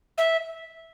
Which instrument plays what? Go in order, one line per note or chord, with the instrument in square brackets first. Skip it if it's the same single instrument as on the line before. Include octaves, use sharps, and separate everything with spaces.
[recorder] E5